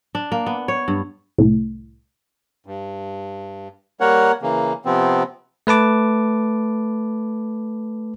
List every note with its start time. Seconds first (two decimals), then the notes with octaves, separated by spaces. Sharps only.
0.15 D4
0.32 A#3
0.46 B3
0.68 C#5
0.88 G2
1.38 C2 A2
2.66 G2
4.00 G3 A#3 A#4 C#5 F#5
4.42 C#3 E3 A#3
4.85 C3 F3 B3 C4
5.67 A3 B4 A5 D6